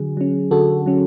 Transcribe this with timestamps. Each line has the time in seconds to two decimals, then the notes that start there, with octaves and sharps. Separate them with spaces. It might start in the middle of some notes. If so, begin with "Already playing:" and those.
Already playing: D3 F#3 G#4
0.17 F#3 C#4
0.51 D3 F#4 A4
0.86 F#3 C#4